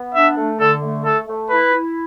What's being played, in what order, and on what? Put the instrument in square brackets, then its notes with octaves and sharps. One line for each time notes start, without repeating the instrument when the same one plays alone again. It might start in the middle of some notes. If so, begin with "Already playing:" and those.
Already playing: [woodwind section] B3
[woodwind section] D4 [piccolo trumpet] E5
[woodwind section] A3
[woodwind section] D3 [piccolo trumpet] A4
[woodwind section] A3
[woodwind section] A3 [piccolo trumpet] A4
[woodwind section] A3
[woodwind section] E4 [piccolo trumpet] B4
[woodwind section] E4